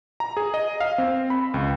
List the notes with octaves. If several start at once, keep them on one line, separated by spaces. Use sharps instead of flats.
A#5
G#4
D#5
F5
C4
B5
C#2